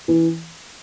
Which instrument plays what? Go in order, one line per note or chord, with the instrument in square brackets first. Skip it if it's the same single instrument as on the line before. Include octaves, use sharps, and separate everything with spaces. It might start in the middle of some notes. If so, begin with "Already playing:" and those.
[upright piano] E3